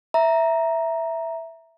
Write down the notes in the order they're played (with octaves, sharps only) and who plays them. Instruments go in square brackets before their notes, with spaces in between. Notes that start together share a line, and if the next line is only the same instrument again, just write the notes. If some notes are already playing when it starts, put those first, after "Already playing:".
[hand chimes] E5 A#5